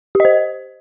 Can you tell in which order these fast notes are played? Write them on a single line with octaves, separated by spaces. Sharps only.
G4 D#5 C5